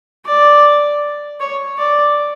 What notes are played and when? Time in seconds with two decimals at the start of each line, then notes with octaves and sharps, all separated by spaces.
0.26 D5
1.40 C#5
1.78 D5